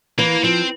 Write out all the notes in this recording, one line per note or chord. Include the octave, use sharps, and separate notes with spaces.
E3 A#3
F3 C4